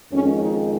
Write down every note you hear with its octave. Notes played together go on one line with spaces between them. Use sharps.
F2 D#3 G#3 C#4
D#4